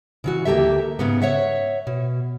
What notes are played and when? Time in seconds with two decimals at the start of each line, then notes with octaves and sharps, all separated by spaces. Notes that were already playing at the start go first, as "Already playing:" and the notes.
0.24 C#3 E3 F#4
0.45 D2 A#3 G4 A4 E5
0.99 G#2 C#3 B3
1.22 C#5 E5 F#5
1.87 B2